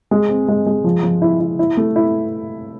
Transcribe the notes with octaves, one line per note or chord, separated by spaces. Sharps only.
G#3
C4
G#3
G#3
F3
F3
E4
E4
E4
A3
E4